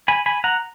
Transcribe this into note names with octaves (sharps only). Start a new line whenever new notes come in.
G#5 B5
G#5 B5
F#5 A#5